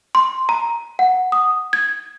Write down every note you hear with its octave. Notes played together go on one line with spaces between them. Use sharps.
C6
A#5
F#5
D#6
G#6